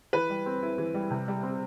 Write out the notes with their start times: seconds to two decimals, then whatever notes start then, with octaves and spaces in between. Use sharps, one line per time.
0.13 E3 B4
0.30 G3
0.46 C4
0.63 E4
0.78 E3
0.94 G3
1.11 C3
1.28 G3
1.43 C4